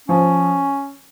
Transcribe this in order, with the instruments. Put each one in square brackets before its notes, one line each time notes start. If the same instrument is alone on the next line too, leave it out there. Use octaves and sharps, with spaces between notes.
[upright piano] F3 [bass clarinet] C#4